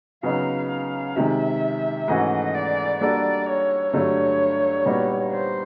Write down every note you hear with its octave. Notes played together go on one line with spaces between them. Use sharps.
C#3 F#3 B3 D#4 F5
F5
C3 D#3 G#3 E5
G#2 E3 A3 C#4 F#4 D#5
D5
G3 A#3 D4 F#4 A4 D5
C#5
G2 D3 F#3 A3 C#5
A#2 G3 B3 D#4 F#4
C5